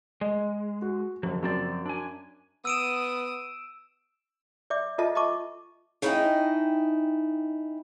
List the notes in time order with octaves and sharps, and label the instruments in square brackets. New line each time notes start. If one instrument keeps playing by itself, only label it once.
[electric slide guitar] G#3 [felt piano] D#5
[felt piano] F#4
[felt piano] F#1 F#2 [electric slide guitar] F3
[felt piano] F#2 [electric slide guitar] F3 C4 D5
[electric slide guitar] D4 G#5
[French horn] B3 [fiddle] D#6 [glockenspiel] E6 D7 E7
[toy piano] D5 E5 D6
F4 A4 D#5 E5 A5
D#5 E5 A5 C#6 D6
[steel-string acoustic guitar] C#4 D#4 E4 D#5 E5 G5